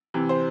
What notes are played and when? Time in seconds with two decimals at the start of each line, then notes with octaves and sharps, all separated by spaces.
0.14 C3 E3
0.29 C5